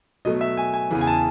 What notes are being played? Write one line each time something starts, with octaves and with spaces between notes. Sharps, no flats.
B2 F#3 A3 D#5
E5
G#5
G#5
E2 C#3 E3
G#5
A5